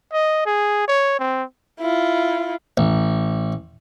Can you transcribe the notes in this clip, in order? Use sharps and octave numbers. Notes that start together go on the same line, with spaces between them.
D#5
G#4
C#5
C4
E4 F4
A1